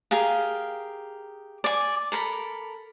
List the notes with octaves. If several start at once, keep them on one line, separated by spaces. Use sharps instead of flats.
G4 G#4 A#4 F5
D5 G#5
A4 A#4 B5